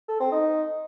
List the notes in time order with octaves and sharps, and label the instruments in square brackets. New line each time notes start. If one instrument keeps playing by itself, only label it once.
[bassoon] A4
C4
D#4